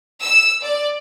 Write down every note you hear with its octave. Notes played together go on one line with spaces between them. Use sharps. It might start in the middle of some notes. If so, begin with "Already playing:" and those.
E6
D5